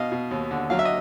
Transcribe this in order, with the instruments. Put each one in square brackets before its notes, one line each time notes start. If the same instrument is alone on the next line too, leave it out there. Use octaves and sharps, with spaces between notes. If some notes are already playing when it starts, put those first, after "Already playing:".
Already playing: [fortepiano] B2 D#5 F5
B2
D#2
D3
F#3 F5
E5
D#5